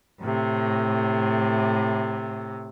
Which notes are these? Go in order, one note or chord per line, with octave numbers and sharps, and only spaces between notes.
A2 C3